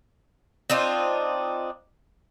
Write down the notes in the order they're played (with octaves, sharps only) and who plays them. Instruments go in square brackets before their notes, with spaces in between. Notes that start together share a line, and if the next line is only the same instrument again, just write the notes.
[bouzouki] C4 D4 D#4 F4